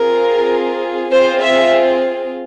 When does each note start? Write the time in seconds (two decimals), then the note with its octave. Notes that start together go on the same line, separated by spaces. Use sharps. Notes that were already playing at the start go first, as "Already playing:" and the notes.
Already playing: C4 F4 G#4 A#4
1.11 C4 F4 G#4 C5
1.41 E5